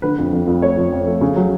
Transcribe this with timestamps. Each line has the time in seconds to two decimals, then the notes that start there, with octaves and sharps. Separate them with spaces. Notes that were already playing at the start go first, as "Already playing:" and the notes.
0.02 D3 B4
0.18 F2
0.32 F2
0.47 F2
0.62 A3 C#5
0.77 F2
0.92 F2
1.07 A3
1.21 C#3
1.36 F#3